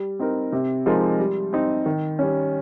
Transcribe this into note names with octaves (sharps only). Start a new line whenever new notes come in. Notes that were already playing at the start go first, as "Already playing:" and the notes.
Already playing: G3
C4 D#4 A#4
C3
F3 G#3 D#4 A#4
G3
C4 D#4
D#3
G3 C#4